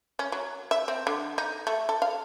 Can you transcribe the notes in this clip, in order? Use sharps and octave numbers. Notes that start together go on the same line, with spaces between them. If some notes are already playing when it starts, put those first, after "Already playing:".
C#4
F#3
E5
C4
D3
D#4
A3
A4
F5